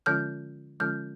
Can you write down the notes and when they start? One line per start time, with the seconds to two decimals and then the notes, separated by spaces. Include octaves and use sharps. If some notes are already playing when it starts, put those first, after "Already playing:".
0.06 D3 F3 G#3 C#4 F4 F6 G6
0.80 D3 F3 G#3 C#4 F4 F6 G6